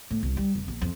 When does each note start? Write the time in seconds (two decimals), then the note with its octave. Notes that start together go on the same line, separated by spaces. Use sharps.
0.10 A2
0.23 C2
0.37 G3
0.55 F1
0.68 A#1
0.82 F2